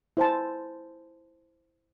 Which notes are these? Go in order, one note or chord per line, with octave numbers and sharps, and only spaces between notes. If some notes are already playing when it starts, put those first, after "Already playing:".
E4 C5 G#5 A5